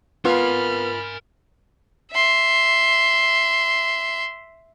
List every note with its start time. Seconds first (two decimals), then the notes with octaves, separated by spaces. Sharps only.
0.25 B3 F4 A#4 G#5 B5 F6
2.12 E5 C6